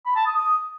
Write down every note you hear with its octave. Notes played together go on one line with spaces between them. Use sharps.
B5
A5
D#6
D#6